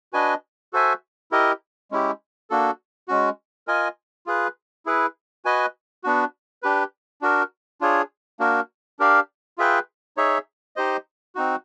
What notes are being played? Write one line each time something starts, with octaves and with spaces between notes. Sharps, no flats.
D4 F#4 B4 D#5 G#5
F#4 A4 C5 E5 G#5
E4 G4 A#4 D#5
G#3 C#4 E4 G4
A#3 D4 F#4 A4
G#3 C#4 F#4
F4 A#4 D#5 G#5
F4 G#4 B4
E4 G#4 B4
F#4 B4 D#5 G#5
B3 D4 F#4
D4 G4 B4
D4 F#4 A#4
D4 F4 G#4 C#5
A#3 D4 F#4 A#4
D4 G4 A#4 D5 F5
F4 G#4 B4 E5 G5
D#4 G#4 C#5 E5
D#4 G4 C5 D#5
C4 D#4 F#4